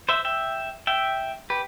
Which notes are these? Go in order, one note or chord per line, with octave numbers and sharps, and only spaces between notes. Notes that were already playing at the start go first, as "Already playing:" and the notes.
C5 E5
E5 G5
E5 G5
G4 B4